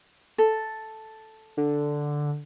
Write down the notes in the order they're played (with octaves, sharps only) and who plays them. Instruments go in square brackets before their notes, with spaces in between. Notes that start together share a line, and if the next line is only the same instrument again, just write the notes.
[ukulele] A4
[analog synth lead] D3